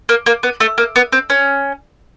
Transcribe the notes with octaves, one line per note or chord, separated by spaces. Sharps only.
A#3
A#3
B3
A3
A#3
B3
C4
C#4